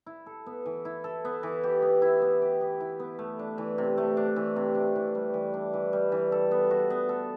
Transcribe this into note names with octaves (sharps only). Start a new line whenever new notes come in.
E4
A4
B3
E3
E4
A4
B3
E3
G4
B3
E4
B3
G4
B3
E4
B3
A3
D4
E3
C3
A3
D4
E3
C3
D4
E3
G3
E3
D4
E3
G3
E3
A4
B3
F#4
B3
A4